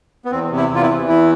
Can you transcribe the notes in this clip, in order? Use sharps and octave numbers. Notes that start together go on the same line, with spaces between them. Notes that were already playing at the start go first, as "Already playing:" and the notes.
B3
E2 C4
C3
E4
E2
F4
E4
E3
E2 E4